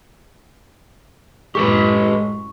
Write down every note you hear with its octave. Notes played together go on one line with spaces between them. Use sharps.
A1 F#2 A2 G#3 G4 A4 B4 C#6